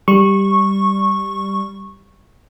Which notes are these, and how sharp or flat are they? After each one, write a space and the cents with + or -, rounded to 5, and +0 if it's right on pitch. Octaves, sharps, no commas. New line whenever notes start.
G3 +0 C#6 -15